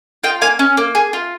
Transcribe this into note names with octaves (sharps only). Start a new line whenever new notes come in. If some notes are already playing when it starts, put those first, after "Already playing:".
F4 D#5 G5
A#3 F5 G#5
C#4
A#3
G#4
F4